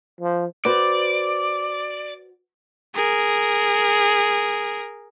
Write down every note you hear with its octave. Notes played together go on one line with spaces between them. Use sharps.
F3
F#4 B4 C5 D5
G#4 A#4